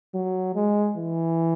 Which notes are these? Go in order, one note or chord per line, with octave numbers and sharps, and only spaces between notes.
F#3
G#3
E3